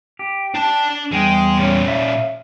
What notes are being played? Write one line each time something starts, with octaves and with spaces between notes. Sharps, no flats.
G4
D4 A5
E2 G3 G#3 G5
A#2 C#4
E5 F5